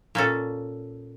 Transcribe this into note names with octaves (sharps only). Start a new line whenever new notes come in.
A#2 C#4 A4